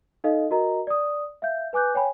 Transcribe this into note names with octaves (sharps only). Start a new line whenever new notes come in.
D#4 A4 D#5 F5
F#4 A#4 D#5 A#5
D5 D#6
E5 F5 G6
B4 G#5 D6 F#6 G6
C#5 G5 G#5 B5